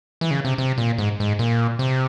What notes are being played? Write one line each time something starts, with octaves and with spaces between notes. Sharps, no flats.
E3
C#3
C3
C3
A#2
G#2
G#2
A#2
C3